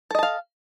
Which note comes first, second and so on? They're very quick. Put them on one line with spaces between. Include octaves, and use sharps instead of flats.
A4 D#5 A5 F5